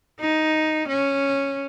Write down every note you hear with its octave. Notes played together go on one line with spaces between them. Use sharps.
D#4
C#4